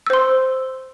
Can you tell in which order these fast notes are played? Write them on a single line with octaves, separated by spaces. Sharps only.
E6 C5 C6